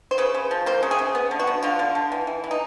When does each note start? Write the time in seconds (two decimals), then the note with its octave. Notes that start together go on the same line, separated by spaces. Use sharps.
0.11 C5
0.18 C#3 B4
0.34 C#3
0.51 F3
0.66 A#3 C5
0.83 C#3
0.91 G#4
0.99 C#3
1.15 B3
1.31 D3
1.39 F#4
1.47 B3
1.63 D3 F4
1.79 D3
1.95 D3
2.12 E3
2.27 E3
2.44 E3
2.51 D#4